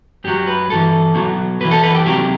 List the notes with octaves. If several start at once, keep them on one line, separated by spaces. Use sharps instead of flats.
F#2 F#3 G4
B4
G2 E3 A4
B1 B2 F#3
F#2 E3 B4
A4
B4
G4
C2 C3 F#3 G4